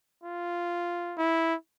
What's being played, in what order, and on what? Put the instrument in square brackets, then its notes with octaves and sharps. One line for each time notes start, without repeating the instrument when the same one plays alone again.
[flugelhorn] F4
[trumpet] E4